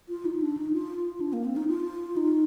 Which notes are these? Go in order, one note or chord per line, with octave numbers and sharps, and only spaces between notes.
F4
D#4
D4
D#4
F4
D4
A#3
C4
D#4
F4
D#4